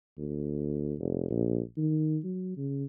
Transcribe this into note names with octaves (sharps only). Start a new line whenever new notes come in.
D2
F1
A#1
D#3
F#3
C#3